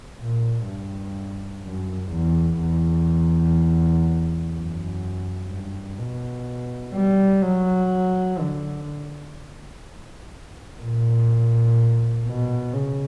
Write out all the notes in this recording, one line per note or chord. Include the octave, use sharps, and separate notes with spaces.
A#2
G2
F#2
E2
E2
F#2
G2
B2
G3
F#3
D3
A#2
B2
C#3